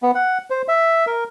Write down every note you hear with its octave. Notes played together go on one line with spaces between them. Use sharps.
B3
F#5
C5
E5
A#4